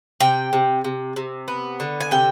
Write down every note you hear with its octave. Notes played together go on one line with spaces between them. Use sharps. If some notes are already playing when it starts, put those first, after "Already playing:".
C3 G5
C3
C3
C3
B3
D3
G#5
C3 G5